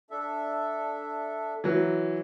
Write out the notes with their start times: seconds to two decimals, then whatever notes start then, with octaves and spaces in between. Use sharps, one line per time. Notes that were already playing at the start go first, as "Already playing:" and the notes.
0.11 D4 A4 E5
1.64 E3 F#3